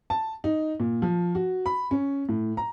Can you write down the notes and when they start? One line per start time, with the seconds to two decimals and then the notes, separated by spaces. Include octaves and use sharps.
0.10 A5
0.44 D#4
0.80 A#2
1.02 F3
1.35 F#4
1.66 B5
1.91 C#4
2.29 A2
2.57 A#5